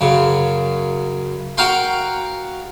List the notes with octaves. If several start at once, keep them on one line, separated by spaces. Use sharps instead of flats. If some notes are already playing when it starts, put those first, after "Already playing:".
F#2 C#3
F#4 A#4 F5 G5 C6